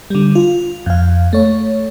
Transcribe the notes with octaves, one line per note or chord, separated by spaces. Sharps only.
D3 G3
F4
F2 F5
A3 C#5